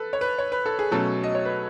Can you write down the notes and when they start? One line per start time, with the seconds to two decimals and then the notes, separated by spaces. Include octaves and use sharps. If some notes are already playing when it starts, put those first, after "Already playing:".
Already playing: A4 B4
0.13 C#5
0.21 B4
0.38 C#5
0.52 B4
0.66 A4
0.79 G#4
0.91 B2 F#3 A3 C#4 A4
1.24 D#5
1.35 C#5
1.45 B4